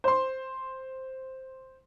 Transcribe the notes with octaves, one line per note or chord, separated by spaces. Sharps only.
C5 C6